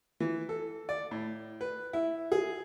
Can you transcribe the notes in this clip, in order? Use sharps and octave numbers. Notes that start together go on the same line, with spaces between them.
E3
A4
D5
A2
B4
E4
G#4